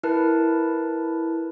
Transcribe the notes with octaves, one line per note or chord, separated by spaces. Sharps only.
E4 A#4 B4 A5